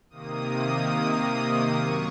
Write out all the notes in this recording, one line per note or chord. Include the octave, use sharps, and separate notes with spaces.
C3 D#3 A#3 D#6
F#2 F#3 C#6